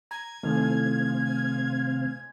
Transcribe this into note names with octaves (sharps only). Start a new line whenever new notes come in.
A#5 G#6
A2 C3 D#3 G#3 A3 C4 F5